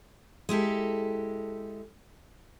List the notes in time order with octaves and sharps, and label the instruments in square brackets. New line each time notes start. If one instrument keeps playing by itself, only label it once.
[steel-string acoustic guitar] G#3 E4 G4 A4